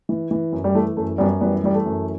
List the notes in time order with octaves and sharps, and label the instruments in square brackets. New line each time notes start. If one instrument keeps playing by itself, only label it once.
[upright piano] E3
E3
F#2
G3
E3 A3
F#2 A3
F#2 G3 B3
E3 G3 B3
E3 G3
A3
F#2